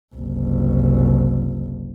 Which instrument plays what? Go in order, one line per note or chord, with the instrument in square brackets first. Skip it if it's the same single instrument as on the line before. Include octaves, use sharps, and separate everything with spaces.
[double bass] F#1 C2